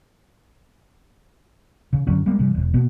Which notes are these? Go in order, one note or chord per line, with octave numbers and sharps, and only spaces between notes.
C#3
F#2 D3 F#3 C#4
G3 G#3 A#3 B3
G2 C3 E3 G3
E1
B2 A#3 B3